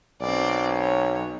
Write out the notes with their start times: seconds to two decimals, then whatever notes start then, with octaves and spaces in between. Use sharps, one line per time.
0.21 B1 C4 D5
0.78 C#5